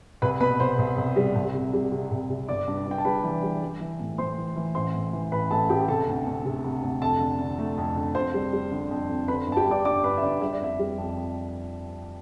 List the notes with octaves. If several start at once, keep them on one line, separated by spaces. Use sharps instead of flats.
C2 B4 B5
B2 B4 B5
C2 C5 C6
C2
C2
G3
C2
C3
G3
C3
C2
C3
G1 D5 D6
G2
G2
G5
A5
G3 B4 B5
E3
G3
G3
E3
A2
A2 C5 C6
E3
E3
A1 C5 C6
A2
E3
A1 B4 B5
A1 A4 A5
A1 G4 G5
C3 A4 A5
D2
D2
C3
C3
D2
F2 A4 A5
D3
D3
A3
F2
D3
F2 C5 C6
G3
G3
D3
F2
F2
D3 B4 B5
G1
A5
G4 G5
G2
D5 D6
G2 D5 D6
G2 B4 B5
E5
D3 D5
G3 E5
D5
F2 E5
G3
F2
F2